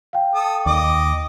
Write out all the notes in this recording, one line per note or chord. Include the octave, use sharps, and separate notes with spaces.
F5 G5
A4 D#6
D#2 D#5 D6 D#6